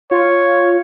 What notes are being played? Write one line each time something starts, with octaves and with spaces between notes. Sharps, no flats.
F4 C#5